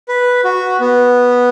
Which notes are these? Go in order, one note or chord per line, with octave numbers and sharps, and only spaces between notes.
B4
F#4
B3